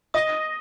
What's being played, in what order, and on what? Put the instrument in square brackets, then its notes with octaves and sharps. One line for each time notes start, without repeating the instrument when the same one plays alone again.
[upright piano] D#5 [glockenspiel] D#6 A#6 D#7 G7